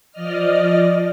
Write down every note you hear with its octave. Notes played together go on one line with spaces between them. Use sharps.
F3 D5 D#5 F6